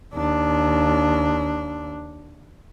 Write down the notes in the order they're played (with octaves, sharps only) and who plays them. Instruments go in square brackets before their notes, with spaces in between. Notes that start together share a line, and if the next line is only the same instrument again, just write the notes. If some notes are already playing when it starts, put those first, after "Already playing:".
[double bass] D#2 D4